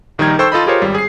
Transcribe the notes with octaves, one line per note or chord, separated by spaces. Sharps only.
A#1 D#3 G3 D#4 A#4 G#6
A4 C5 G5 C#6 E6 G6
F4 A4 D#5 B5
F4 G4 G#4 A#4 C5 C#5
G#1 G3
G#4 C7